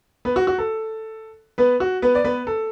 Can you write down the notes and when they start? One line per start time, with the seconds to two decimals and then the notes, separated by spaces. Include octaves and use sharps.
0.25 B3 B4
0.36 F#4
0.47 F#4
0.58 A4
1.58 B3 B4
1.80 F#4
2.02 B3 B4
2.15 D5
2.25 B3 B4
2.47 A4